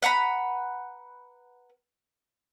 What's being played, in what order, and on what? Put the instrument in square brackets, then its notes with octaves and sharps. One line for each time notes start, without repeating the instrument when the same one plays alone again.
[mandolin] B4 F#5 A#5 B5